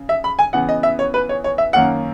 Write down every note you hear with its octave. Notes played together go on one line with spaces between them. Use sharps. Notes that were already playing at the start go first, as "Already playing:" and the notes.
Already playing: C#3
E5
B5
G#5
C#3 E3 B3 F#5
D#5
E5
C#5
B4
C#5
C#5
E5
F#2 D#3 A#3 C#4 F#5